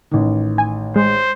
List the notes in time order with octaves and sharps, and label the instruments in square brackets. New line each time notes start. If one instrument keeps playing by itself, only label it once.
[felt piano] A1 D#3
[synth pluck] G#5
[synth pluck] G#3 [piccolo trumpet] C5